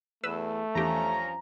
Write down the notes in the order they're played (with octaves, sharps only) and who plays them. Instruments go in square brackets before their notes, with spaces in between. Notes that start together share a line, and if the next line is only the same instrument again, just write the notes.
[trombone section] E2 [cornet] A3 [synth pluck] B4 E6
[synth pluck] E2 G4 [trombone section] G2 F3 C#4 [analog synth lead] A#5